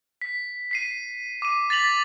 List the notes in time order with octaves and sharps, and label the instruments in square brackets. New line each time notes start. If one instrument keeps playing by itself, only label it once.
[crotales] B6
B6 C7 D#7
D6 D#7
A6 B6 F7 F#7